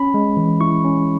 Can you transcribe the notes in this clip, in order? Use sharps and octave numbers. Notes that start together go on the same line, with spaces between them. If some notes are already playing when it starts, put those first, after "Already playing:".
Already playing: C#4 B5
G#3
E3
E4 C#6
C#4